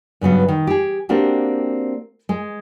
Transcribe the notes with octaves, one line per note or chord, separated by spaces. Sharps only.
G2 C#3 F#3 B3
D#3
G4 G#4
A#3 C4 D4 F#4 G4
G#3